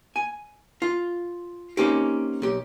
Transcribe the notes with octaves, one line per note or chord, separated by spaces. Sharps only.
G#5
F4
A#3 C4 C#4 D#4 G4
B1 G4